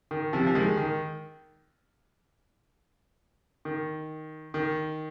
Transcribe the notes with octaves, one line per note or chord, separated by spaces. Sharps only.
D#3
C3 F3
F3
D#3 G#3
D#3
D#3
D#3